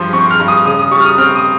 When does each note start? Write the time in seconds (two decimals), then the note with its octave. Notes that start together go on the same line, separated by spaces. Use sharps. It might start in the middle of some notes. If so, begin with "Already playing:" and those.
Already playing: G2 F3 C6
0.13 C4 C#6
0.31 F6
0.40 G2
0.48 D#6
0.65 C#3 D#6
0.79 D#6
0.91 G3 C#6
1.01 F6
1.05 D#6
1.18 C4 F6
1.35 D#6